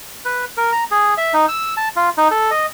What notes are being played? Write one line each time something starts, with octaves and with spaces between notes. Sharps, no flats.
B4
A#4
A#5
G#4
E5
D#4
E6
A5
F4
D#4
A4
D#5